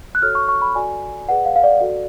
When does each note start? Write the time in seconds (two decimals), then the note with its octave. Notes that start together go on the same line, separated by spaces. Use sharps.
0.15 F#6
0.22 F#4 A4 C#5 F6
0.35 C#6
0.49 C#6
0.62 B5
0.75 F#4 A4 D5 G#5
1.29 G#4 B4 D5 F#5
1.45 F5
1.56 F5
1.64 D5
1.81 F#4 A4 D5